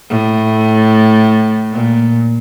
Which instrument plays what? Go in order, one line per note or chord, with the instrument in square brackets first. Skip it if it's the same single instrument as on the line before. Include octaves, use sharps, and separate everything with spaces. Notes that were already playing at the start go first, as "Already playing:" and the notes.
[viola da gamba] A2
A#2